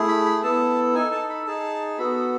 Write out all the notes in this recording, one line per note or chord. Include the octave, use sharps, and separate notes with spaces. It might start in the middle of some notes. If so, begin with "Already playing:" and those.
Already playing: A3 E4 G#4
B5
B5
B3 E4 A4 A5
D#4 A4 G#5
A5
B5
D#4 G#4 A5
B3 F#4 A4 B5